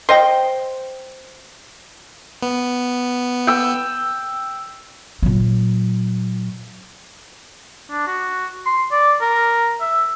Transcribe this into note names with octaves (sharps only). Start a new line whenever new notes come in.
C5 D#5 G5
B3
G5 E6
A#2 F#3
D4
F#4
C6
D5
A#4
E5